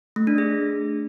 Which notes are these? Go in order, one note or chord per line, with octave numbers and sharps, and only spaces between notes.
A3
D4
G#4